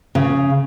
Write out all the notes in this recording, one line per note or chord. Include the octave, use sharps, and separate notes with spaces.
C#3